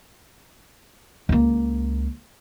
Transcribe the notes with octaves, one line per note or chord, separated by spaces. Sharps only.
C#2 A#3